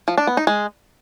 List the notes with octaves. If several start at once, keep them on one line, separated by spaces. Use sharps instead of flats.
F3
D4
B3
D#4
G#3